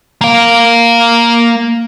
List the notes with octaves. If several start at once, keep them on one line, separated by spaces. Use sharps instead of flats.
A#3 F5